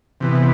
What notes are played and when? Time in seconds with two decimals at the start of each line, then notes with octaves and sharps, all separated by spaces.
0.20 C3 E3 B3